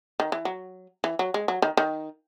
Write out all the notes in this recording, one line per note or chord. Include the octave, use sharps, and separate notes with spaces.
D#3
E3
F#3
E3
F#3
G#3
F#3
D#3
D#3